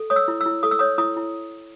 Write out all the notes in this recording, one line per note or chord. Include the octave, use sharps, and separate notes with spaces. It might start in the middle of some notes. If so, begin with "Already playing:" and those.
Already playing: A4
C#5 D#6
E6
E4
E6
E4
A4 D#6
E6
C#5 D#6
E4 D#6
E4